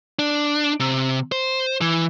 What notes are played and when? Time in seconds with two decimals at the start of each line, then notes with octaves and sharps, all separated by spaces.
0.19 D4
0.80 C3
1.32 C5
1.81 E3